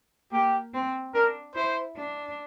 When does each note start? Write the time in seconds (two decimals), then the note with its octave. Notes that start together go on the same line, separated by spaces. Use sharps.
0.32 A#3 G4
0.74 C4
1.14 D4 A#4
1.55 E4 C5
1.97 D4